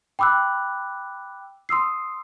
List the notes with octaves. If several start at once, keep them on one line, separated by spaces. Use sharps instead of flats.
G5 B5 D6 E6 F#6
C6 D#6 E6 C7